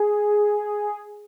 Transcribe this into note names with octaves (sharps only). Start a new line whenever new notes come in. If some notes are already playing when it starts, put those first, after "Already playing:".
Already playing: G#4